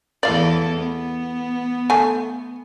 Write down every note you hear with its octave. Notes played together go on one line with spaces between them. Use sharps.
E2 E3 A4 D5 F5
B3
A3 G#5